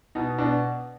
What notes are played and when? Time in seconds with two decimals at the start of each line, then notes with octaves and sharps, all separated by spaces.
0.15 B2 D#4
0.38 B2 D4